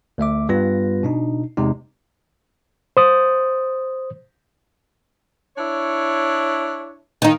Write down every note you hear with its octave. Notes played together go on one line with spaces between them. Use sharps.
D2 A3 E5 D6
G2 G3 B3 F4 B4 A#6
B2 D4 D#4
E2 C3 G#3 D#4
C5 D#6
D4 E4 C#5
D#3 D#4